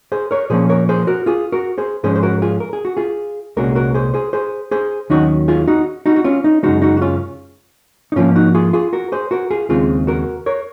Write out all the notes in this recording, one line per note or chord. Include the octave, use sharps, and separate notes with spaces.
G#4 C5
A#4 C#5
A#2 F3 A#3 C#4 G#4 C5
A#4 C#5
G#4 C5
F#4 A#4
F4 G#4
F#4 A#4
G#4 C5
G#2 F3 G#3 C#4 G#4 C5
C5
F#4 A#4
F4 G#4
A#4
G#4
F#4
F4 G#4
C2 A#2 G#3 C#4 F#4 A#4
F#4 A#4
G#4 C5
G#4 C5
G#4 C5
G#4 C5
D#2 D#3 F#3 C#4 D#4 F#4
F4 G#4
D#4 F#4
D#4 F#4
F#4
C#4 F4
D#4
F#2 C#3 G#3 D#4 F#4
D#4 F#4
F#4
C#4 F4
D#4
G#2 F3 A#3 C#4 F4
D#4 F#4
F4 G#4
F4 G#4
F#4 A#4
G#4 C5
F#4 A#4
F4 G#4
D#2 C#3 G#3 C4 F4 G#4
F#4 A#4
A#4 C#5